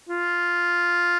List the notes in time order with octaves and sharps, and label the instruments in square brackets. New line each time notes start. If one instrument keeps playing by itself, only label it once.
[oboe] F4